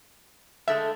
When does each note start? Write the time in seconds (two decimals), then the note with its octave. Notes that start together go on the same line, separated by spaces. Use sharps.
0.68 D3 G#3 A3 E5